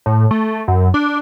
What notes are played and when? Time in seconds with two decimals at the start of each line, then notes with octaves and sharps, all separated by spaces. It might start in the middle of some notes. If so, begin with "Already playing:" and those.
0.06 A2
0.31 A3
0.68 F#2
0.94 D4